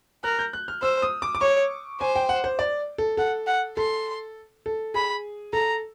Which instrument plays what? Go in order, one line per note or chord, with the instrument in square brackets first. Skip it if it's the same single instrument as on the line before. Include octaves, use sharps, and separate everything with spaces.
[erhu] A#4 [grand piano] F#6
[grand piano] G6
F#6
F6
[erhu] C5 [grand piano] E6
[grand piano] D#6
D6
D6
[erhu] C#5 [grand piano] C#6
[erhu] C5 [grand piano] G#5
[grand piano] G5
F#5
C5
D5
A4
[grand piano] A4 [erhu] F#5
[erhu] F#5
[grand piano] A4 [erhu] C6
[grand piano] A4
[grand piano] G#4 [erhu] B5
[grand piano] A4 [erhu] A#5